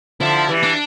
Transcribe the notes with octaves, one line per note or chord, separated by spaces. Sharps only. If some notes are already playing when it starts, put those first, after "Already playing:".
D3 F3 E4
E3 G3
D4